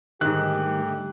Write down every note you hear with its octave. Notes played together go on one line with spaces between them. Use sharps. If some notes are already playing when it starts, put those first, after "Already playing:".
G#2 D3 D#3 G3 A3 G4 F#6